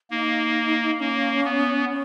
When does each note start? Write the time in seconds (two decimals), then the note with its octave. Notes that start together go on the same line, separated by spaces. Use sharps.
0.11 A#3 D#4
1.00 A#3 C#4
1.45 B3
1.89 C#4